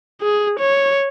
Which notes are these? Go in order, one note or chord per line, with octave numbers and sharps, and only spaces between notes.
G#4
C#5